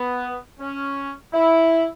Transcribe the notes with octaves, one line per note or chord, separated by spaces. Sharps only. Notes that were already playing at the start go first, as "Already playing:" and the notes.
Already playing: B3
C#4
E4